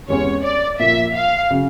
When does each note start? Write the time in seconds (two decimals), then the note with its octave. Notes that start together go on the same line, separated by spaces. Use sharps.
0.08 E2 C3 E3 G#3 C#4 C#5
0.44 D5
0.79 A#2 F3 A#3 E5
1.16 F5
1.51 C#3 F#3